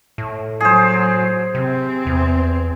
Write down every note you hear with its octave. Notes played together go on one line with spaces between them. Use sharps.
A2
F#3 G#4 C5
C3 C4
E2